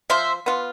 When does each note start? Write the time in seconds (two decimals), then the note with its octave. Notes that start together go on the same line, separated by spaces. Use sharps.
0.10 F3 C5 E5
0.46 B3 F4